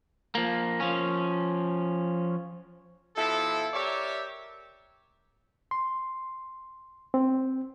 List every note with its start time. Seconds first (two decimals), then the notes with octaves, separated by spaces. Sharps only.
0.35 F3 A#3
0.80 F3 C#4
3.16 B2 F3 E4 A4
3.73 G4 A#4 C#5 D5 E5
5.71 C6
7.14 C4